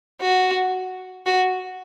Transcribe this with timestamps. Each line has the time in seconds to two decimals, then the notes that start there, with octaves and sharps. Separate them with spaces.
0.22 F#4
1.26 F#4